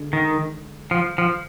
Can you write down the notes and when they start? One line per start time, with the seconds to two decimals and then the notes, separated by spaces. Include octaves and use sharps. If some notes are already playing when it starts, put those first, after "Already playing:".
Already playing: D3 G#3 D4 G#4
0.13 D#3
0.91 F3
1.18 F3